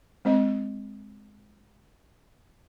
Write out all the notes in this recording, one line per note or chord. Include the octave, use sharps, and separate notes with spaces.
G#3 C4 D#5